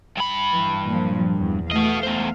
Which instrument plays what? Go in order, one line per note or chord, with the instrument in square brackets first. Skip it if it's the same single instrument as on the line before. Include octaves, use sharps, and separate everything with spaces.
[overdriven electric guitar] G2 B5
[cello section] E3
A#2 F3 F#3
E2
[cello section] A3 F5 [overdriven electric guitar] B3 D#5
[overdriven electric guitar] E2 C5